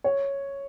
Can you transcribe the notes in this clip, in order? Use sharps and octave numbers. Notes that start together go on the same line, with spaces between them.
C#5